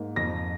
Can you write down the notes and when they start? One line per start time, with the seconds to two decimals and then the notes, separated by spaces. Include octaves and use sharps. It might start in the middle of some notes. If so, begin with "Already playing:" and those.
Already playing: G#2 A#3
0.16 F2 A#6